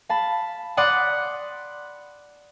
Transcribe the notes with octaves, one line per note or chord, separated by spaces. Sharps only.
F5 A5 B5
D5 F#5 B5 C6 D#6